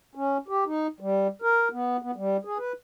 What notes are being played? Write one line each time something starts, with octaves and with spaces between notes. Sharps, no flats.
C#4
G4
D#4
G3
A#4
B3
B3
G3
G#4
B4